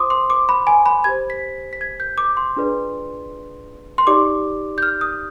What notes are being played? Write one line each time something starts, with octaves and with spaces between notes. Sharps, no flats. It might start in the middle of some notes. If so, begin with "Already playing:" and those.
Already playing: F4 C5 C6 D6 D#6
C6
D6
B5
G#5
B5
G4 C5 G#6
B6
B6
G#6
G6
D6
C6
D4 F4 G#4 B4 D5
C6
D#4 G4 D5 D6
G6
F6
D#6